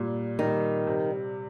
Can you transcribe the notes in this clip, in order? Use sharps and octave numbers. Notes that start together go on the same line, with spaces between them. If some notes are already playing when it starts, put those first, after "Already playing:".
Already playing: A#2 G3
D#3 G3
C3